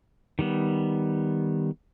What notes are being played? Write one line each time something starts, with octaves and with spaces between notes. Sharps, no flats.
D#3 G3 B3